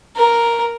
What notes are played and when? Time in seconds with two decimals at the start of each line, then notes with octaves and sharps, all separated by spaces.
0.17 A#4